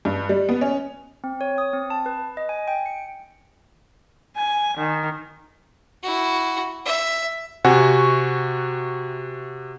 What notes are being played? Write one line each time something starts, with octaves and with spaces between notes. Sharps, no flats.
G2
G3
B3
C#4
C4
C#5
D#6
C4
A5
B4
D#5
G#5
G5
C#7
G#5
D#3
E4 F#4
E5
C3 F#4 F#5 G#5 C#6